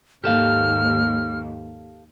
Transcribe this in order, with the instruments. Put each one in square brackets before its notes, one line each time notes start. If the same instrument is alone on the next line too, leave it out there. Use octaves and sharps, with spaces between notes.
[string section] D#2 G#2 [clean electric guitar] G4 A4 F5 [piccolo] F6